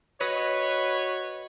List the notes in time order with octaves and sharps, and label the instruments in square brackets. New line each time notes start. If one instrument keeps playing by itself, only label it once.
[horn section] F#4 C#5 [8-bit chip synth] B4 [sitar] D#5